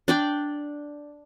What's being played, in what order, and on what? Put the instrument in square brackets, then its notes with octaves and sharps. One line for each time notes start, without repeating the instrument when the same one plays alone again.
[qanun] D4 D5 G5